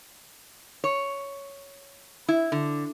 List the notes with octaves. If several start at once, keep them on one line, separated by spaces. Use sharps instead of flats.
C#5
E4
D3